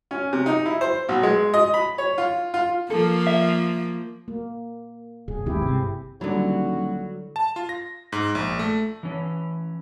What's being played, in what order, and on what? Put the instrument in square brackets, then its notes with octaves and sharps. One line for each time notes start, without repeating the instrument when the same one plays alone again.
[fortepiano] C#4
C3
D#4
E4
C5
B1
G#3
D#5
B5
C#5
F4
F4
[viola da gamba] F3 A#3 [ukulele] A4
[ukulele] E5
[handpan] A#3
[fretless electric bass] E1 [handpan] G#4
[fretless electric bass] D#2 G#3 [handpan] C4 E4 G4
[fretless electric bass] G1 C3
[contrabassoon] D#1 [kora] D3 E4 [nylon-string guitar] F#3 G3 [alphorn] F#4
[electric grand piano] A5
F4
A#6
G#2
A#1
A3
[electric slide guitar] E3 C#4